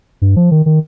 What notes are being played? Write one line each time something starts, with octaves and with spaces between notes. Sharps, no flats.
G2
F3
D#3
D#3